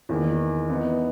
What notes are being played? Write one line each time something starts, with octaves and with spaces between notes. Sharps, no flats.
E2 D#3 A#3 D#4
E3 B3 D#4